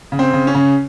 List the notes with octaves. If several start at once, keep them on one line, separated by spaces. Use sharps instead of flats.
C#3
C4
C#3
C#4
C#3